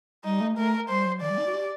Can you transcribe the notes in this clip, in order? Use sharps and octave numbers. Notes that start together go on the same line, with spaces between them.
G3 D#4
A3
A3 A#4
G3 C5
F#3
D#3 D5
G3
D#4
F#4
G4